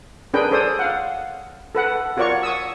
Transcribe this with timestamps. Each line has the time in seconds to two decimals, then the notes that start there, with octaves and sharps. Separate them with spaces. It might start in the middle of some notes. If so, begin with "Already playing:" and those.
0.34 C#4 D4 G#4 A#4 B4 G5
0.51 G#4 A4 C5 D5 D#6
0.79 F5 F#5
1.75 A4 B4 F#5
2.17 F4 F#4 A#4 C#5 D5 C#6
2.43 C#6 D#6 E6